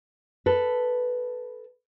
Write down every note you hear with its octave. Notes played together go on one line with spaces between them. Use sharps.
A4 B4